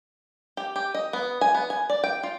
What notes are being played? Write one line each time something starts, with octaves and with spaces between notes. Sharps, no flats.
G4
G4
D#5
B3
G#5
B3
G#5
D5
G5
F4